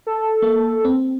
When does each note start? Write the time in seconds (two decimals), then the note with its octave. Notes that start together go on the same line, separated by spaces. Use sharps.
0.07 A4
0.42 A#3
0.85 C4